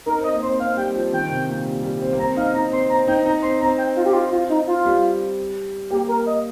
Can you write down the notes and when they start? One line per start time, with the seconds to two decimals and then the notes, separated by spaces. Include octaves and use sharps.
0.06 D#4 A#4
0.19 C4
0.24 D#5
0.32 A#3
0.42 C4 C5
0.59 C4 F5
0.77 G3 G5
0.95 F3
1.12 D#3 G5
1.30 C3
1.48 A#2
1.65 G3
1.83 G3
2.02 C4
2.13 A#3
2.19 C4 A#5
2.37 D#4 F5
2.54 D#4 A#5
2.72 C4 C6
2.90 C4 A#5
3.08 D#4 G5
3.26 D#4 A#5
3.42 C4 C6
3.61 C4 A#5
3.78 G5
3.96 F4
4.05 G4
4.13 F4
4.32 F4
4.49 D#4
4.67 F4
4.85 G3
5.90 A#3 G4
6.08 A#4
6.26 D#5